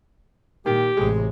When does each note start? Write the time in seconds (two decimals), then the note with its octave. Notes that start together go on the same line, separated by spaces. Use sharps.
0.66 A#2 D#3 G4 G5
0.97 A1 C3 G#3 G#4